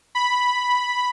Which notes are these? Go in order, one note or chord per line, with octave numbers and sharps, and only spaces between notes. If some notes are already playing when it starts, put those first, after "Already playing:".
B5